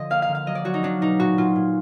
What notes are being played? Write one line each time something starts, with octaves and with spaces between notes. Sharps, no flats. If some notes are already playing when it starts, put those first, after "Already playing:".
Already playing: D3 F3 D#5
A#3 F5
F5
D3
F5
F#3 D#5
D5
F#3 F#4
D#4
F#3 D4
B2 D#4
A#2 F#4
A#2 F4
A#2